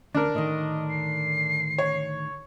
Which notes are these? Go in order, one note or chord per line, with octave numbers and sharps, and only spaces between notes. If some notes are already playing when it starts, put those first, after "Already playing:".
D2 D4 A#4
A2 D3 D#3 D#5
C7
C#5